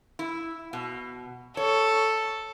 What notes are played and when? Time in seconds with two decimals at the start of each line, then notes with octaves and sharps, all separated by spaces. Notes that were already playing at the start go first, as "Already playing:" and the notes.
0.19 E4
0.73 B2
1.57 A4 C#5